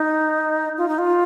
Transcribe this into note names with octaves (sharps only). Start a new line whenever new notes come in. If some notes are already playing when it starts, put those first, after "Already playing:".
Already playing: D#4
F4
D#4
F4